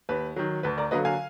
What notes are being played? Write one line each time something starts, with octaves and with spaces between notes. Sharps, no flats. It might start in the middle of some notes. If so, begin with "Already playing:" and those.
D#2 B4
D#3 F#3
D2 B4
A#4 D5
D3 F#3 A#3 B4 D#5
F5 G#5